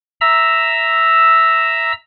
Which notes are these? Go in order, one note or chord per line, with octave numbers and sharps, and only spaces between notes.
E5 A#5 E6